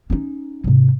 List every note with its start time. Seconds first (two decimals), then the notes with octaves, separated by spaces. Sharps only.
0.10 C#4 D#4
0.64 G#2 C3